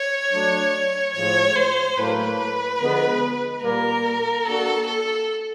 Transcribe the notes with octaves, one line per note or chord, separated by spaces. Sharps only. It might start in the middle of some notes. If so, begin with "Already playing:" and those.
Already playing: C#5
F#3 A3 D4
A2 F3 G#3 C#5
C5
A2 F#3 A#3 B4
D3 F3 G#3 B3
A#2 G3 A#3 A#4
A#3 D4 F#4 A4
A4